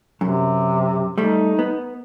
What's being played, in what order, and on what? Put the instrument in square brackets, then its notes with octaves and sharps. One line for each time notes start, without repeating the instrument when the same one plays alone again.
[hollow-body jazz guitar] F#2 [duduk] C3
[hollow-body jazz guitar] G3 A3 [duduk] D#4
[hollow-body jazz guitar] B3